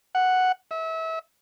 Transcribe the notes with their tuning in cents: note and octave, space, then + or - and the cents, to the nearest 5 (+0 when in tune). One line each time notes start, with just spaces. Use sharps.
F#5 +0
E5 -30